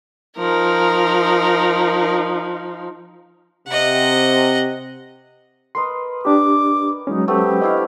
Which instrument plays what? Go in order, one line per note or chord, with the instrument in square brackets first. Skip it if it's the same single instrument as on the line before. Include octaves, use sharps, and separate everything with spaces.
[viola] F3 D#4 [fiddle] A#4
[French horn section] C3 [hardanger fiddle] D#5 F#5
[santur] A#4 B4 D#5 [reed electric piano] C6
[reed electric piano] D4 G4 [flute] D6
[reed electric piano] F#3 G#3 C#4 [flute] D#4
[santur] A3 B3 C4 [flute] G4
[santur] D4 E4 F5 [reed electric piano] D#5